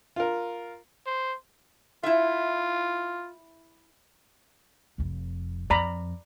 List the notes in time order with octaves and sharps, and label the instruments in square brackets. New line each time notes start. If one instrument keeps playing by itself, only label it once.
[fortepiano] F4 A#4
[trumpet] C5
[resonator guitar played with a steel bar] E4 E5 [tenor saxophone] F4
[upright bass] F1 F2
[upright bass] F2 [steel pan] D5 A#5 B5